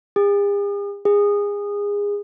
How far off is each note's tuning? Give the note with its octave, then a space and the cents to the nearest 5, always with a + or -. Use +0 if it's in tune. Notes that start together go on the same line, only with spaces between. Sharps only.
G#4 -45
G#4 -25